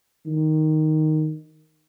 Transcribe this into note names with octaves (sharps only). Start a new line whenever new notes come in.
D#3